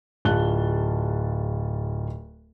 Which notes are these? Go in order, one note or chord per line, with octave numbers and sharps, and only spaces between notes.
D1 F4 A5 F#6 G7